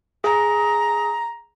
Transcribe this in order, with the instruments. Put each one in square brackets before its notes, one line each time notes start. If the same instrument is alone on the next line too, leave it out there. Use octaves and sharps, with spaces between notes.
[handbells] G#4 [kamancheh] A#5